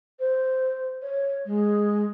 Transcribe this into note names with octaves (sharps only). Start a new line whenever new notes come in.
C5
C#5
G#3